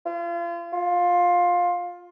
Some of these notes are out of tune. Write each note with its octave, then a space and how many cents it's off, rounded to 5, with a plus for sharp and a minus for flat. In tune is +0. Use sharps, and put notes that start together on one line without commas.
F4 -35
F4 +15